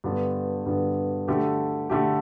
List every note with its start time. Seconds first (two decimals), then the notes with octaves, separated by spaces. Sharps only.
0.04 G2 D3 B3
0.66 G2 D3 B3
1.28 D3 A3 G4
1.90 D3 A3 G4